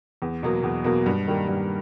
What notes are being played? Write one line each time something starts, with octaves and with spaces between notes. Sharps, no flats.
E2
B2 F#3 A#3
E2
B2 F#3 A#3
G2
D#3 G3 A#3
G2